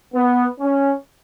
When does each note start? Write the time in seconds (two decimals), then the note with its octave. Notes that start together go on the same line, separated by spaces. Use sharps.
0.15 B3
0.61 C#4